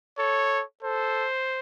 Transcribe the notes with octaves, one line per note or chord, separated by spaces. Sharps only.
A4 C#5
A4 C5